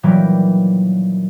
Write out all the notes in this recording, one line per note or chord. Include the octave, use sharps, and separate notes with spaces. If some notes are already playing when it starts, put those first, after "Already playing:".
A#2 D#3 E3 F#3 G3 A#3